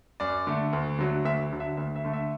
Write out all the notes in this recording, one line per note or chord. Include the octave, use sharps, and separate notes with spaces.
F#2 D5
D3 A3
D2
D3 F#3 A3
D2 E5
D3 F#3
E5
D2 E5
E5
D3 A3
E5